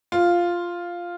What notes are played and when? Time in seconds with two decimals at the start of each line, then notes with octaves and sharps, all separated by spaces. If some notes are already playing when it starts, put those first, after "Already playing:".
0.12 F4